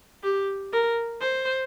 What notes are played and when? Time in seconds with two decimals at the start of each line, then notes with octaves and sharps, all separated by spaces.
0.23 G4
0.73 A#4
1.21 C5